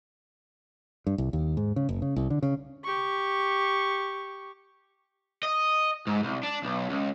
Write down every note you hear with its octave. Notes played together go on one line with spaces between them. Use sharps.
G2
C2
D#2
G#2
C#3
F#1
C#3
C2
D3
C#3
G4 C#6
D#5
G#2
C2
D4
B1
C#2